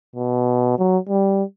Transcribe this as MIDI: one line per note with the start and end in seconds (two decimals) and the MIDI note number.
0.16 0.78 47
0.79 0.98 54
1.09 1.43 55